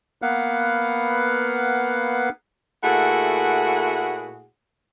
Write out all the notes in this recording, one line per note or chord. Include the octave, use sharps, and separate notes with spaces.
A#3 B3 B4 F5 F#5
A#2 A3 E4 F#4 G#4 F#5